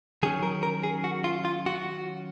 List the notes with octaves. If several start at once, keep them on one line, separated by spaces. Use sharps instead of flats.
D#3 F#3 C#4 G#4
A#4
A#4
G#4
F#4
F4
F4
F#4